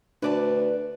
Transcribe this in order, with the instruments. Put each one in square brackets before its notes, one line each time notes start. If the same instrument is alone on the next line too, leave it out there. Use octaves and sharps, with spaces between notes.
[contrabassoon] D2 [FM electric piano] D4 [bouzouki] B4 D5 A5